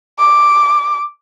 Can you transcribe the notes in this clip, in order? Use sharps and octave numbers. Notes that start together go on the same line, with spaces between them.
D6